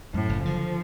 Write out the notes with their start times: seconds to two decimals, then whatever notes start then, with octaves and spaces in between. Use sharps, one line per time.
0.14 F#2 A2
0.29 F#1
0.45 D3 F3